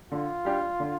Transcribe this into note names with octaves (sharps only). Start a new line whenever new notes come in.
D3 F4
G3 D4 G4
D3